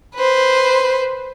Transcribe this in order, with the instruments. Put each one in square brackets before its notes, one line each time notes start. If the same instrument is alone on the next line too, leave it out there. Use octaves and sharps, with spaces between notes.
[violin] B4 C5